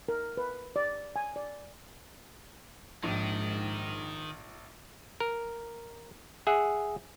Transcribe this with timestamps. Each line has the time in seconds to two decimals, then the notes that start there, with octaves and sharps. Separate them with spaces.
0.09 A#4
0.37 B4
0.76 D5
1.16 G#5
1.36 D5
3.03 A#1 G#2 D#3
5.20 A#4
6.47 G#4 E5 F#5